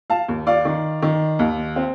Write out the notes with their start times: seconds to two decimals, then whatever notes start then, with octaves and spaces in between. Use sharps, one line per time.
0.10 F5 A5
0.28 D#2
0.47 D5 F5
0.65 D#3
1.02 D#3
1.39 D#2
1.76 C4